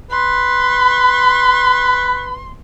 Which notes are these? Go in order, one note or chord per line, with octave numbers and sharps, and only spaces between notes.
B4 C6